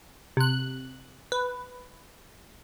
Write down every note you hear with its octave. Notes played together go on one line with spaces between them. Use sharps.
C3 F#6
B4